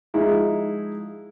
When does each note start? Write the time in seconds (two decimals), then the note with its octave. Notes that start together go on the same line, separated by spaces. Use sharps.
0.14 F3 G#3 D#4 E4 G#4